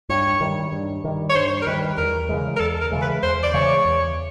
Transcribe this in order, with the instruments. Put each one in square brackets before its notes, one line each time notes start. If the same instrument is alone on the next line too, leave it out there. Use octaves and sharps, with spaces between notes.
[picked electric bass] G2 [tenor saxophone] C#5
[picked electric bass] D#3 G3
G2
D#3 G3
[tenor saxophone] C#5
[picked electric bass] G2 [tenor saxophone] C5
[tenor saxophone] A#4
[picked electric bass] D#3 G3 [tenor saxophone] B4
[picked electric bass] E2 [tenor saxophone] A#4
[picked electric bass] C#3 E3 G#3
[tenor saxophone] A#4
[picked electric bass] E2 [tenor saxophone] A4
[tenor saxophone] A#4
[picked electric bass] C#3 E3 G#3
[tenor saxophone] B4
[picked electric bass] E2 [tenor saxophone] C5
[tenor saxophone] D5
[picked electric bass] C#3 E3 G#3 [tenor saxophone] C#5
[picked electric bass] E2